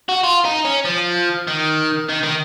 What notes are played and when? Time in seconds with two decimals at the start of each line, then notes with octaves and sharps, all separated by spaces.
0.09 F#4
0.24 F4
0.45 D#4
0.65 C#4
0.85 F3
1.47 D#3
2.09 D#3
2.23 D#3